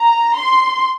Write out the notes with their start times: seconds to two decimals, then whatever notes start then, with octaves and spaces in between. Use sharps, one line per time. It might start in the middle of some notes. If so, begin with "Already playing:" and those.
Already playing: A#5
0.36 C6